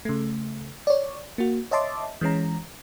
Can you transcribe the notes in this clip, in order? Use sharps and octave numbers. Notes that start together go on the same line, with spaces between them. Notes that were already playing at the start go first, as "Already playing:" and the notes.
C#3 A3
C#5 D5
A#3 F#4
C#5 D#5 E5 A5 C6 D6
E3 G#3 C#4 A#5